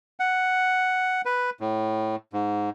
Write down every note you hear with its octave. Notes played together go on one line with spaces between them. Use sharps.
F#5
B4
A2
G#2